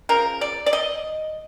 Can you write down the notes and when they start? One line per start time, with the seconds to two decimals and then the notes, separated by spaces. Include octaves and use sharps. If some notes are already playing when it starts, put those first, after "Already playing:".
0.09 C#3 F3 A#4
0.41 D5
0.66 D5
0.73 D#5